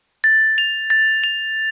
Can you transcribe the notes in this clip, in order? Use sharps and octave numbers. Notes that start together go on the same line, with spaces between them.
A6
F7
A6
F7